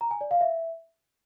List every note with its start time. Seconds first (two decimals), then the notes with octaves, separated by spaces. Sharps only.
0.01 A#5
0.11 G#5
0.21 D5
0.31 F5
0.41 E5